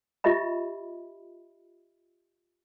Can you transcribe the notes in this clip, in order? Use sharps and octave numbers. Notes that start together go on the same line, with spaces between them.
F4 G4 D#5 E5 B5